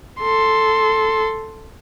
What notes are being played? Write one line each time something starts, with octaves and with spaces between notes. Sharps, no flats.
A4 C6